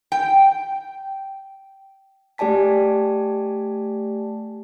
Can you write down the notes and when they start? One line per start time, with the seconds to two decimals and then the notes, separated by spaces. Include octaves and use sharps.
0.12 G5
2.38 A3 G4 D5 G#5 A5 B6